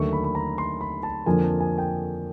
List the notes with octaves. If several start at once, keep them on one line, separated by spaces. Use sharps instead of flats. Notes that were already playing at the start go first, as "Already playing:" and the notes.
Already playing: D#2 D3 F#3 A3 C#6
B5
B5
A#5
C6
B5
A5
F2 D3 F3 A#3 G#5
A5
G#5
G5